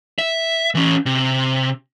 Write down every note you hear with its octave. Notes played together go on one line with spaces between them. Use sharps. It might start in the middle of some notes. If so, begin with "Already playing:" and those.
E5
E3 C#4
C3